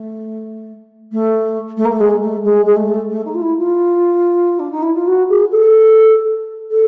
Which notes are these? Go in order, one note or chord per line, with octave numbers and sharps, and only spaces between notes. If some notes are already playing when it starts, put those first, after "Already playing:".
Already playing: A3
A3
A3
A#3
A3
G#3
A3
G#3
G#3
A3
A3
D#4
F4
E4
F4
D4
D#4
E4
F4
F#4
G#4
A4
A4